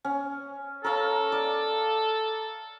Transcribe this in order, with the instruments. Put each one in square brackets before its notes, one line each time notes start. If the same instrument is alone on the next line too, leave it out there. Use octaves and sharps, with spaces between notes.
[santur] C#4
[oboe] A4 [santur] A#4 C#5 F5
[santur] D5